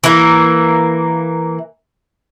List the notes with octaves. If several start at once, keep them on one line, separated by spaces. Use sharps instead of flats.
E3 A#3